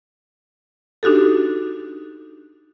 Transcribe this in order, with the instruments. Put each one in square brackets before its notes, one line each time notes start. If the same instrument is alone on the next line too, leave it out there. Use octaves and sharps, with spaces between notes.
[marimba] D4 D#4 F#4 G4 A4